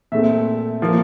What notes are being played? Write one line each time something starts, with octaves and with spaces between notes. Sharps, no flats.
A#2 A3 C4 E5
F3 A#3